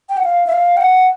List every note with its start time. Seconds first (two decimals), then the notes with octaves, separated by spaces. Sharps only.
0.10 G5
0.17 F#5
0.24 F5
0.47 E5
0.53 F5
0.77 G5
0.81 F#5